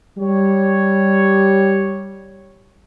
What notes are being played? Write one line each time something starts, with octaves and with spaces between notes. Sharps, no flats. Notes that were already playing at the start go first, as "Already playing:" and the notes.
G3 C#5